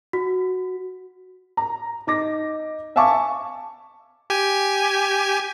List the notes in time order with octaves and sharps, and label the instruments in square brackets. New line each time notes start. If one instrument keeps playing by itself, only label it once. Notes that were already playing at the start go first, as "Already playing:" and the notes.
[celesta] F#4
[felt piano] A#5
D#4 D6 A#6
E5 F5 G#5 A5 C#6 D6
[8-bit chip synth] G4 G#5